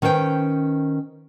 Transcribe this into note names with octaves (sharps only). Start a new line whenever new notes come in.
D#3 C#4 B4 C5 G5